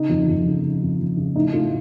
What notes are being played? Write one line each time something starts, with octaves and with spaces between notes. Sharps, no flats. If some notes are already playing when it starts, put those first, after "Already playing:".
Already playing: C#3 D#4
F2
F2
C#3
C#3
F2
F2
C#3
A2 D#4
A2 F4